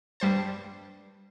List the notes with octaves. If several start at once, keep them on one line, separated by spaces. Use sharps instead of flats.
G2 G3 C5 A5